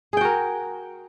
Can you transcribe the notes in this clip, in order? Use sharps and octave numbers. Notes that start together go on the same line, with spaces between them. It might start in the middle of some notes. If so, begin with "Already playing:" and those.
F#4 G#4 A#4 G5